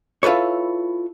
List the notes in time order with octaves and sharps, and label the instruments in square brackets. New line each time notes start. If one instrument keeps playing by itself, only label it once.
[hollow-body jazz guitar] E4 F4 A4 B4 C#5